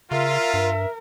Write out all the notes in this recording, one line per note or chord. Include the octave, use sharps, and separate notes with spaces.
C#3 F4 A#4 E5
G2